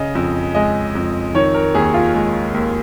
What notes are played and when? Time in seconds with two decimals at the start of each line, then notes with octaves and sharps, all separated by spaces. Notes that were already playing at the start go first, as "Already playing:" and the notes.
Already playing: C#3 D#5
0.15 F2
0.54 G#3 D#5
0.95 F2
1.34 D#3 C#5
1.54 A#4
1.75 D#2 G#4
1.94 F4
2.15 G#3
2.54 D#2